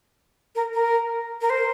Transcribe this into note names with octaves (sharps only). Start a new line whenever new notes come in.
A#4
A#4
A#4
C5